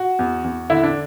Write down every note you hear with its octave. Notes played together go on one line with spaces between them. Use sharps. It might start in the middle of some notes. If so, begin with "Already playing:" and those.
Already playing: F#4
E2
E2
D3 E4
D4